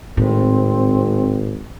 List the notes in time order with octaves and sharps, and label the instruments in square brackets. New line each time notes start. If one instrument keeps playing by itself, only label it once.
[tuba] G#1 [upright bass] A2 [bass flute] C4